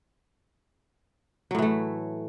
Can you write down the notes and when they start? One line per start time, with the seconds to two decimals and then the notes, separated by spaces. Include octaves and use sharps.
1.51 F#3
1.55 A2
1.58 E3
1.62 A3